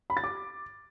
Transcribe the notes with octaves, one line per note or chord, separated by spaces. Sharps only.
B5
A6
D6